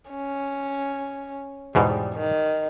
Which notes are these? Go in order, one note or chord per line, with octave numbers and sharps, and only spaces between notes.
C#4
E2 G#2 B2 G3
D#3